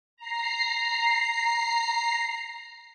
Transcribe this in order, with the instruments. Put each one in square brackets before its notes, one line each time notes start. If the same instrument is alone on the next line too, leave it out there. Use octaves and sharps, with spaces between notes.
[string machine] A#5 C7